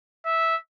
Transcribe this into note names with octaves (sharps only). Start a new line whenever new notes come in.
E5